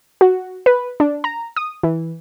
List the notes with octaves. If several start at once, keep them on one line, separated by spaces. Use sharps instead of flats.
F#4
B4
D4
A#5
D#6
E3